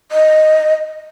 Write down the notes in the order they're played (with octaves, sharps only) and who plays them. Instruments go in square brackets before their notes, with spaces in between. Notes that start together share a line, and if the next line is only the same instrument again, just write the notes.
[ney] D#5